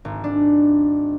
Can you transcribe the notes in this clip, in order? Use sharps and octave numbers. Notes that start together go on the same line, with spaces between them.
G#1
D4